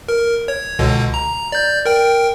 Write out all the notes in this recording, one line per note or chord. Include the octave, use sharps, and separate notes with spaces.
A#4
C#5
C#2 B2 D3
A#5
D5 G6
A#4 G5